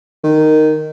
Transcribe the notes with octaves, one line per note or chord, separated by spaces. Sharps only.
D#3